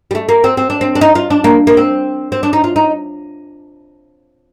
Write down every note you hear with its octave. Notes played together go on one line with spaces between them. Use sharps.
G3
A3
A#3
C4
C4
D4
C4
D4
D#4
F4
D4
A#3
A#3
C4
C4
D4
D#4
F4
D#4